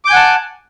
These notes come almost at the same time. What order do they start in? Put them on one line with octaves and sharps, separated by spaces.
D6 G6 G#5 F#5 A5